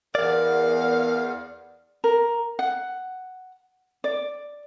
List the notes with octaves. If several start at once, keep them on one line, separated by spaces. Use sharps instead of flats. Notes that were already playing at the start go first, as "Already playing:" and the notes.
E2 A#4 D5 F5
A#4
F#5
D5